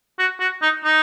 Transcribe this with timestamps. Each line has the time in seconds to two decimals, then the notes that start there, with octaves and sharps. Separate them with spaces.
0.19 F#4
0.40 F#4
0.62 D#4
0.84 D#4